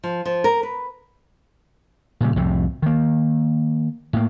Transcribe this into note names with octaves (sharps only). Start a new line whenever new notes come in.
F3
F3
A#4
B4
A#2 C#3 G3
C2 F2 A2 C3
D#3 A#3
A2 A#3